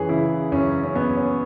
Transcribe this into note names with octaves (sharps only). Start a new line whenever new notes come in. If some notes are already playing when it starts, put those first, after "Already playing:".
Already playing: F#2 E3 G#4 B4 C#5
C#3 E4
F#2 C#4
C#4
F#2 B3
C#4